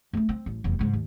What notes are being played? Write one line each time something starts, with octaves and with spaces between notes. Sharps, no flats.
A3 C#4
C4
A1
F1 E2
C#2 G#2
D#2